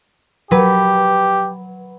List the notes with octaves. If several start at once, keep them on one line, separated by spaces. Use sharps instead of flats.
F#3 G4 B4